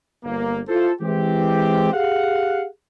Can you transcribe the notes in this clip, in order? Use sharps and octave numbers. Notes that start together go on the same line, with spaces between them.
G1 A#3
E4 F4 A4 C5
E3 G#3 C4 G4
G4 G#4 F5 F#5